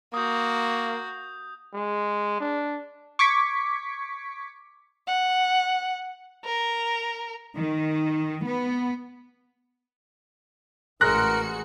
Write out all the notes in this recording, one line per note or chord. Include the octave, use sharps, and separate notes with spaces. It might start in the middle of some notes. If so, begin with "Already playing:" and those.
A#3 F#4 D#6 G6
G#3
D4
C#6 D6 G#6 B6 C#7
F#5
A#4
D#3
B3
A1 G#3 F#4 A#4 F#6 A#6 C#7